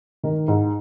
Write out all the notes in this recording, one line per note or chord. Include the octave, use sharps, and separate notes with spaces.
D#3 A#4
G#2